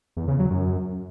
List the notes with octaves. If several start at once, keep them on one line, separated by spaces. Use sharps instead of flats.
E2
C#3
F#3
F#2